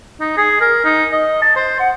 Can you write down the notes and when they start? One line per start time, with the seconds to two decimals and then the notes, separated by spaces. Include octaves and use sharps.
0.20 D#4
0.37 G#4
0.61 A#4
0.85 D#4
1.13 D#5
1.42 A5
1.56 C5
1.80 F#5